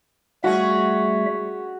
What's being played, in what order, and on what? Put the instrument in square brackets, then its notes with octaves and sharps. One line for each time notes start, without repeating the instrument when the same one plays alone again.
[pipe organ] G3 A3 E5 [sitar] C#4 G#4 [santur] F#4